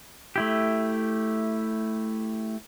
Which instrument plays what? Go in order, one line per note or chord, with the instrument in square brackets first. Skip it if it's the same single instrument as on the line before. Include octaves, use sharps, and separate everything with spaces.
[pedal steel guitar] A3 E4 G4